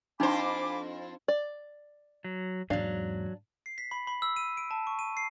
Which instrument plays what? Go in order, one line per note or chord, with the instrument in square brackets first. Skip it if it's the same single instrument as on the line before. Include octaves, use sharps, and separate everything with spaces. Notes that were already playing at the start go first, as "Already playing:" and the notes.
[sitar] F2 C5 [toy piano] D4 D#4 [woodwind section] G#5 B5 D6
[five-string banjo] D5
[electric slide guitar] F#3
[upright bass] E2 G#2 [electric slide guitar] F#3 [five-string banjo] D4 F5
[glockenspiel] C7
B6
B5
B5
E6
D#7
D7
A5
C#6
D#7
C7